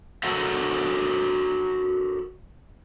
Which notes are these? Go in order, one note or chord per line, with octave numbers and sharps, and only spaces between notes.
F#4 A4 A#4 C#5 E5 F#5